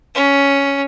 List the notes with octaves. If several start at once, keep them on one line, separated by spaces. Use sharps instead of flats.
C#4